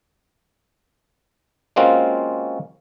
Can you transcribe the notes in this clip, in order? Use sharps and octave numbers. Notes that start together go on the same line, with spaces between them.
G#3 A#3 C4 C#4 F4 F#4